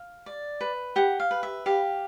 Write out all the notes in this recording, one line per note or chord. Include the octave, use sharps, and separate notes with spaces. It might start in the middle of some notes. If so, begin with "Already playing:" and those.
Already playing: F5
D5
B4
G4 F#5
F5
B4
E5
G4 F5